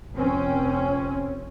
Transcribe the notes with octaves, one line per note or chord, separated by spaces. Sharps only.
F1 C4 C#4